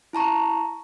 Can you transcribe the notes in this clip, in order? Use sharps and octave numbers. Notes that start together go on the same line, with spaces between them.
E4 A5 A#5 C#6